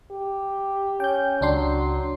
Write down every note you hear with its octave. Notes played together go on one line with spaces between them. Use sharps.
G4
C#4 G5 G6
C#2 F#3 D4 C6